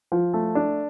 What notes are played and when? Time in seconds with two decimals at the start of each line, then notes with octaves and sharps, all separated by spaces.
0.12 F3
0.34 A3
0.55 D4